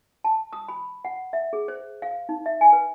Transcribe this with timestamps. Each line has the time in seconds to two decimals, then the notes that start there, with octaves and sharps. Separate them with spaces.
0.24 A5
0.53 D#6
0.68 B5
1.05 F#5
1.33 E5
1.53 G#4
1.68 C5
2.02 F5
2.29 D#4
2.46 E5
2.61 G#5
2.73 B4